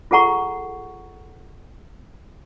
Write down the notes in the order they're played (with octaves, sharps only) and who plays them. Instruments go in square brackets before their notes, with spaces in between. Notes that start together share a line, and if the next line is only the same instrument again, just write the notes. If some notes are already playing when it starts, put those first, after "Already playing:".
[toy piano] F4 G#4 A4 F#5 A#5 C#6